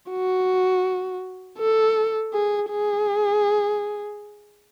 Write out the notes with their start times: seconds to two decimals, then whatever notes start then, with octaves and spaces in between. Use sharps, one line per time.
0.11 F#4
1.59 A4
2.33 G#4
2.70 G#4